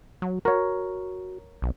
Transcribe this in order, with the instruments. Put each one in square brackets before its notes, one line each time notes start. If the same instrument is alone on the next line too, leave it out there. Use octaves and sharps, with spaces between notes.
[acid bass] F#3
[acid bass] F#4 [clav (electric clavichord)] A#4 C#5
[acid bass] B1